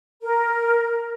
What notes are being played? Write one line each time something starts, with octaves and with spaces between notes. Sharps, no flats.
A#4